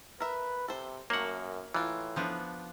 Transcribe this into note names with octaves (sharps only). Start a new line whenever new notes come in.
A#4 B4 E5
C3 A4 C5
F#2 F#3 A3 A#3 F#5
A2 E3 A#3 F4
F3 B3 D4